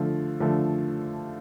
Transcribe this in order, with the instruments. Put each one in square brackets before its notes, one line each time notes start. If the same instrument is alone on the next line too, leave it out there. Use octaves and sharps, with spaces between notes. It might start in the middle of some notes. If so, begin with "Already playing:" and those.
Already playing: [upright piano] D3 F3 A3
D3 F3 A3